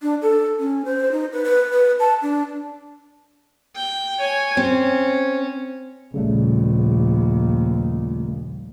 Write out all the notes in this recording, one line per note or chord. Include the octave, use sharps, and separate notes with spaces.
D4
A4
C#4
C5
D#4
B4
B4
B4
A5
D4
G5
C#5 G#5
C4 C#4
A#1 D#2 C#3 G3 A3